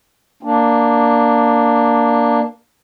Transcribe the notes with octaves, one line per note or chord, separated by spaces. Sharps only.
A#3 D4